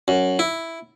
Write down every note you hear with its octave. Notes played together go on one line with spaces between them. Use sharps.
F#2
E4